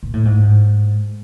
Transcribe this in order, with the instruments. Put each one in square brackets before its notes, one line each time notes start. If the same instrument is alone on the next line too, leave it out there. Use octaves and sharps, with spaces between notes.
[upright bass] A#2
A2
G#2